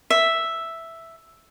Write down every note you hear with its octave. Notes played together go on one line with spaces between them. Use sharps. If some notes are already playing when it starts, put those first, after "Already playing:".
E5